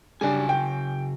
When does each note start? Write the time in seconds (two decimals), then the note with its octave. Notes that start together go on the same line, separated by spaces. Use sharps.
0.21 C#3 F#3 G3 D4 G#5
0.49 G5